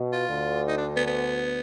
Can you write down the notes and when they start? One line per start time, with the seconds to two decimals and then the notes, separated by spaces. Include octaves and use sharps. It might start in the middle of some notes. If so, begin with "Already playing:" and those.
Already playing: B2
0.13 F4
0.29 D2 D3
0.68 D#4
0.77 D4
0.96 B3
1.06 B3